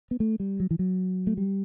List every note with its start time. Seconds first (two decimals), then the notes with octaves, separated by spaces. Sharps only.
0.11 B3
0.20 A3
0.40 G3
0.60 F#3
0.71 E3
0.79 F#3
1.27 A3
1.37 G3